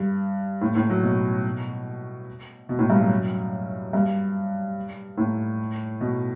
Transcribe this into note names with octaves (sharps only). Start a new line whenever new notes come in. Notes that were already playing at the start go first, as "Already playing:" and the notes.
Already playing: G2
A2
A2
F#3
B2
B2
A2
G2
F#2
G2
A2
B2